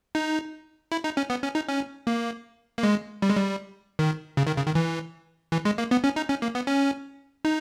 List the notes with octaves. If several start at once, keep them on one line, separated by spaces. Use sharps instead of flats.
D#4
E4
D#4
C#4
B3
C#4
D#4
C#4
A#3
A#3
G#3
G3
G#3
G3
D#3
C#3
D#3
C#3
D#3
E3
E3
G#3
A#3
B3
C#4
D#4
C#4
A#3
B3
C#4
D#4